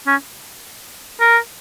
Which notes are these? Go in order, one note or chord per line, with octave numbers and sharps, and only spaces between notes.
C#4
A#4